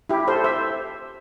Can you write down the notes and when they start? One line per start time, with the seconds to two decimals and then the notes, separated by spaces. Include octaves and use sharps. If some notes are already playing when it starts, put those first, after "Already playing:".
0.09 E4 G4
0.28 A4 C5
0.44 C5 E5